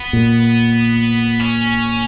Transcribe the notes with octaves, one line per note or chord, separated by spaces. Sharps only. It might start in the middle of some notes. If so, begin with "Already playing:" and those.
Already playing: B3
A#2
C#4